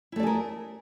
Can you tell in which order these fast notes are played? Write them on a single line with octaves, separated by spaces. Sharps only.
E4 A3 D5 G#4 A#4